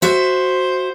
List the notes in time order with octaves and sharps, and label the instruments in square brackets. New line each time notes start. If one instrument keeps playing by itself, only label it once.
[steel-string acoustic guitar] F#4 E5 [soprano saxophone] C5